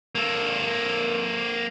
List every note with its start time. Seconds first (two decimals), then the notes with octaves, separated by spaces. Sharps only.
0.15 A#3 A4